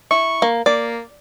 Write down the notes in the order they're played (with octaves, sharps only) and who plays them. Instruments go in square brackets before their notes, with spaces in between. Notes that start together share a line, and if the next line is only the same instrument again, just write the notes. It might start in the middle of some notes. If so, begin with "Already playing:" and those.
[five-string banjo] E4 [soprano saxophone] C#6
[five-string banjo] A#3
[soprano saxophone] A#3 [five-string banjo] D5